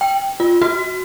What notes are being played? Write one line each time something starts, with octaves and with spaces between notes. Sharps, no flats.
G5
F4
F#4